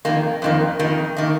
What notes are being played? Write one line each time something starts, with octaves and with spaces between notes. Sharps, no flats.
F2 D#3 A#3
F2 D#3 A#3
F2 D#3 A#3
D#3 A#3